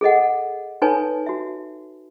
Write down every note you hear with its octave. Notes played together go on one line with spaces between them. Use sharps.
G#4 A4 D#5 F#5
D#4 A4 B4 C#5 G#5 A5
F#4 E5